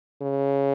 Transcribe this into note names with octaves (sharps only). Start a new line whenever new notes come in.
C#3